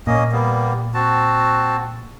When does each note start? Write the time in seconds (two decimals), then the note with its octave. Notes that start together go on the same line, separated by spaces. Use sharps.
0.07 A#2 A#3 C#4 D#5
0.32 G3 A#3 B3
0.94 C4 F#4 A5